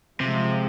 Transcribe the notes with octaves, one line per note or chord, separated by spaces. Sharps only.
C3 F3 G#3